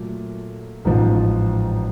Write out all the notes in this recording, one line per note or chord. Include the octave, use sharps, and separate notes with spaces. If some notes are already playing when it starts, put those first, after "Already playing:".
Already playing: A#2 F#3 A3
A1 G#2 F3